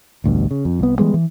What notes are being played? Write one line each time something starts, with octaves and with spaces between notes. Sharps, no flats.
A1 D2 G2 B2
C#3
F2
C2 B3
E3 G3 G#3 B3
E3